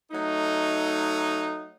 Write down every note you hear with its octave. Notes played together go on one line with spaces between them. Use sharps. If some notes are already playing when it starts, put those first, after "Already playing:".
F#3 A3 D#4